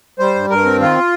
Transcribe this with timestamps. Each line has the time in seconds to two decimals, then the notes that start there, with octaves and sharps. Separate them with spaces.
0.19 G3 C5
0.35 G2
0.50 G2 A#4
0.65 C4
0.80 D#3 F4